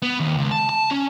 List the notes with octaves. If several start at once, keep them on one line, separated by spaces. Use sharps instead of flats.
B3
D#2
C#2
A5
A5
C#4